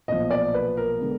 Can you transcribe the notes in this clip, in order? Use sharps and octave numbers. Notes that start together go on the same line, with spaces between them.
B1 A#2 F3 D#5
D5
B4
A#4
D3 G#3 B3